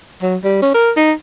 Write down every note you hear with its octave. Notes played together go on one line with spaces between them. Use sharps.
F#3
G3
C#4
A#4
D#4